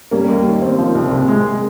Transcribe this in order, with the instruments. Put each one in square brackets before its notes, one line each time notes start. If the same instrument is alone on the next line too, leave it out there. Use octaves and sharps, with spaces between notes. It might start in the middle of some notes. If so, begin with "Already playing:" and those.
[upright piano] G3 [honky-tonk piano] A#3 C#4
[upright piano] D#2
D#3
C4
F3
C2
C3
G#3
G#3